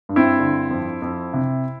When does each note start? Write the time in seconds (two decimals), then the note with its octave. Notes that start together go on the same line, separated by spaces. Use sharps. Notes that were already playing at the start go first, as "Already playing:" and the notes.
0.09 G2
0.16 C4 E4
0.39 D3
0.71 F2
1.02 F2
1.33 C3